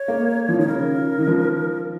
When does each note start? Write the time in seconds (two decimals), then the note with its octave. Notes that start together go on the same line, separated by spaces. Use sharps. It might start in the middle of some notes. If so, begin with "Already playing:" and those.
Already playing: C#5
0.08 A#3
0.49 F3
0.59 D#3 C#5
0.68 C#3 A#4
1.19 D#3
1.27 F3